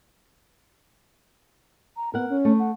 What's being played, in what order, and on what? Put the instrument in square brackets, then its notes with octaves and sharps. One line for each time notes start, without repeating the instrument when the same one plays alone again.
[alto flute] A#5
[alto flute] B3 [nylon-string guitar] A#4 F#5
[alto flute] C#4
[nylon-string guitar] A3
[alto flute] F#5